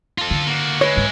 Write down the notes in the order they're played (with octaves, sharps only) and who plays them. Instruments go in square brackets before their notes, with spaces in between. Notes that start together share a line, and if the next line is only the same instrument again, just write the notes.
[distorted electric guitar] F4 A4
[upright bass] D3
[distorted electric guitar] A#3 F#4
[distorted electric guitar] G#3 E4 [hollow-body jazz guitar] B4 C#5
[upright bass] G#2